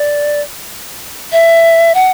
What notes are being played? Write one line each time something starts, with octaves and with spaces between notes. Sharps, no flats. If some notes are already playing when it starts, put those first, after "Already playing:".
Already playing: D5
E5
F#5